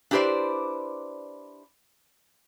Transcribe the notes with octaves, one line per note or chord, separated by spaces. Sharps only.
D4 E4 G4 B4 C5 D5